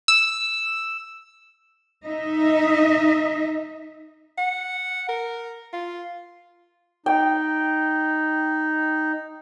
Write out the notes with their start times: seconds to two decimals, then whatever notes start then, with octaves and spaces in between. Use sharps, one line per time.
0.08 E6
2.04 D#4 D#5 E5
4.38 F#5
5.09 A#4
5.73 F4
7.06 D#4 G5